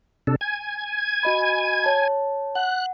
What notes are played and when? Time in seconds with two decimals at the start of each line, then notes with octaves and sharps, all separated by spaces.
0.27 C3 D4 A4
0.41 G#5 G#6
1.23 F#4 D#5 B5
1.84 C#5 A5
2.55 F#5 F#6